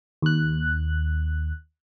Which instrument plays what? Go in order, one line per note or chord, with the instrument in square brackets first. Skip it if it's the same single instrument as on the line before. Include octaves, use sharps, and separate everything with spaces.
[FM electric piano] D#2 F#6